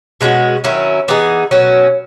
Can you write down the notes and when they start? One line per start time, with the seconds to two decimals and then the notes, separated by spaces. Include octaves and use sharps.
0.21 B2 G#3 C#4 F#4
0.64 D#3 F#3 C#4 E4
1.08 E3 B3 D#4 G#4
1.51 B2 F#3 C#4